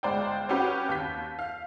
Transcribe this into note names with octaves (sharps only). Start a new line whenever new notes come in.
G1 G#3 C5 D5 G5
C4 C#4 F#4 G4 B4
D#2 G6 B6
F5